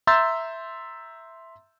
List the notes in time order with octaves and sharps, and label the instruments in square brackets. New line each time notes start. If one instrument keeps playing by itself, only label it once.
[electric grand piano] E5 A#5 C6 E6 G6 A6